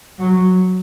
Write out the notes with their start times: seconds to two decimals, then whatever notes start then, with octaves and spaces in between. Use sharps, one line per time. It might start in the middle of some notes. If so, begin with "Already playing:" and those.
0.19 F#3